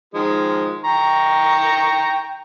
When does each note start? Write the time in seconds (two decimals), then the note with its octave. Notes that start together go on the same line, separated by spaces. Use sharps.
0.14 D#3 F3 G#3
0.85 G5 A#5 C#6